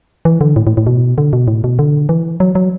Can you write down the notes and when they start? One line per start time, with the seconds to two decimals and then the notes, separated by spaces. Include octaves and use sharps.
0.25 E3
0.41 D3
0.56 A2
0.67 A2
0.77 A2
0.87 B2
1.18 D3
1.33 B2
1.48 A2
1.64 B2
1.79 D3
2.09 E3
2.40 F#3
2.55 F#3